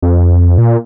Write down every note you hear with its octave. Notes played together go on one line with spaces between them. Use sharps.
F2
A#2